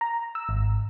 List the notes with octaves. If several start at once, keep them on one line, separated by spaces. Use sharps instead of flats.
A#5
E6
G#1